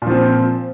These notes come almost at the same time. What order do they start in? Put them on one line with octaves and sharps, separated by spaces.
A#2 F3 C4